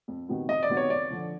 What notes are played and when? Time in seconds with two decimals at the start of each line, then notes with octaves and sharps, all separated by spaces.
0.08 F2
0.28 C3 D#3 F#3 B3
0.48 F2 D#5
0.63 D5
0.69 C3 D#3 F#3 B3
0.77 C#5
0.90 F2 D5
1.10 D3 F3